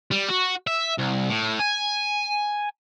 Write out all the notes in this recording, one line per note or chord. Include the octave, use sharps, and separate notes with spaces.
G3
F#4
E5
C2
A2
G#5